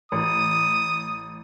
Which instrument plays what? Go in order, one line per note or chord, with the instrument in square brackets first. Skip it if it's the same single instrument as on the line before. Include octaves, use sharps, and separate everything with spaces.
[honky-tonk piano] A1 [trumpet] D#6